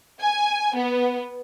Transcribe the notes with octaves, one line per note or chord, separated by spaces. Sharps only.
G#5
B3